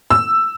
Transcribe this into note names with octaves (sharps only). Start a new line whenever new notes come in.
E6